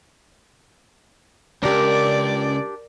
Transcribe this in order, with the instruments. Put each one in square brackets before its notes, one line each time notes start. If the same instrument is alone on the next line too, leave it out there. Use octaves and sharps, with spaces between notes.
[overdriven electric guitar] C#2 [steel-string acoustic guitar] D4 G4 [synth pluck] A#4 [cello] D5